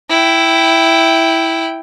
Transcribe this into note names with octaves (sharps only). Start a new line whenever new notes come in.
E4 G5